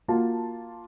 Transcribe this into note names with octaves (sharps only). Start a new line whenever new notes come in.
A#3 F4 F#4 A5